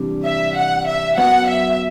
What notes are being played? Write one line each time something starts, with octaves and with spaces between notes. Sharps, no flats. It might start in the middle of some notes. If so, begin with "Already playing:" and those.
Already playing: C3 E3 G3 D4
E5
F#5
E5
F#2 F#3 B3 F#5
E5